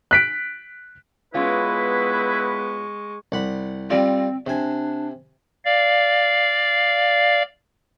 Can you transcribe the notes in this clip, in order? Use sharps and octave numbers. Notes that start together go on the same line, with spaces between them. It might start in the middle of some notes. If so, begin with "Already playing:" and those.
F#6 B6 D7
G#3 B3 C#4 E4 F4 B4 C#6
C2 F#5 B5
G3 C4 F4
C3 D4 G#5
D5 F5